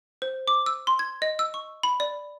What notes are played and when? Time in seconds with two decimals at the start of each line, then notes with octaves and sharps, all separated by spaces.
0.22 C5
0.48 D6
0.66 E6
0.87 C6
0.99 G#6
1.22 D#5
1.39 E6
1.54 C#6
1.83 B5
2.00 D5